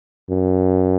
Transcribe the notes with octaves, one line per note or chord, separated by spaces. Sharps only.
F#2